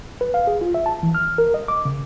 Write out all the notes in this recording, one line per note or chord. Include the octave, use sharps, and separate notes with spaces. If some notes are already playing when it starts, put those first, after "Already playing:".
B4
F5
G#4
F4
E5
A5
E3
F6
A#4
D#5
D6
C#3